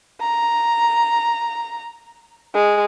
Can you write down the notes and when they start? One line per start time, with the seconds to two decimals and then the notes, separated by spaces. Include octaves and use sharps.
0.21 A#5
2.54 G#3